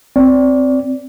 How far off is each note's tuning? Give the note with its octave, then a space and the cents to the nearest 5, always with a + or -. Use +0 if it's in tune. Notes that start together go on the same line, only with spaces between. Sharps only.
C4 +0 D5 -20